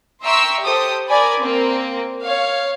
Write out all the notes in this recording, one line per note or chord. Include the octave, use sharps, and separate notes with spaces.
E5 G5 A#5 C6 C#6 E6
G4 A4 C5 D#6
A#4 D5 G#5 B5
A#3 C4
C#5 F5